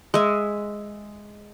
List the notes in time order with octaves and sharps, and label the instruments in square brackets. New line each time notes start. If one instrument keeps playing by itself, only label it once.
[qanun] G#3 E5